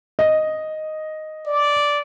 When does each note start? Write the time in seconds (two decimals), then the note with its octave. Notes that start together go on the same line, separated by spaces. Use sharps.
0.19 D#5
1.46 D5